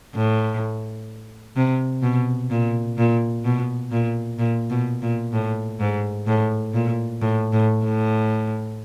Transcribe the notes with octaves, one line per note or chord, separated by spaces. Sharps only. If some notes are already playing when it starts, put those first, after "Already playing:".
A2
C3
B2
A#2
A#2
B2
A#2
A#2
B2
A#2
A2
G#2
A2
A#2
A2
A2
A2